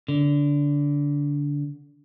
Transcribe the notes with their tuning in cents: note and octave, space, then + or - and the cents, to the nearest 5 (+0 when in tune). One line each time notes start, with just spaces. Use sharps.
D3 -20